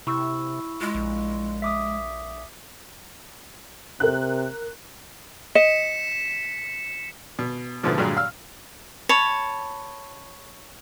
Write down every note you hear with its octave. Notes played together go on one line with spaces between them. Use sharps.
C3 E4 C#6 E6
G#3 F4
A#1
E5 D6 D#6
C3 A#4 F#6
D#5 B6 C#7 E7
B2
G#2 B2 D3 F3 A3 B3
G2 A#2 D3 F#3 G#3
F5 E6 F6
C#5 A5 B5